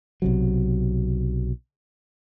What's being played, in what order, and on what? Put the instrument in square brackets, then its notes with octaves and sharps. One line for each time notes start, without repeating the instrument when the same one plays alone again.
[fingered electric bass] B1 C3 F#3